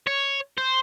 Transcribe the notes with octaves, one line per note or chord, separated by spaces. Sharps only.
C#5
C5